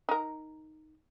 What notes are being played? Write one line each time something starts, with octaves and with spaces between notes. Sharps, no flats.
D#4 A#4